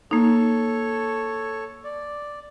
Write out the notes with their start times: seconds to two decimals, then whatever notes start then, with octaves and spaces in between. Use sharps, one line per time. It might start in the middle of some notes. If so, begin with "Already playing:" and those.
0.11 A#3 D#4 A4 C#5
1.84 D5